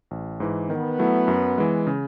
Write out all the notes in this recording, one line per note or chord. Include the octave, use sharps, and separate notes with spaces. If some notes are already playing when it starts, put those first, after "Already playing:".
A1
G#2 E3
D#3 B3
F#3 A3 E4
F#2
E3 G#3
C#3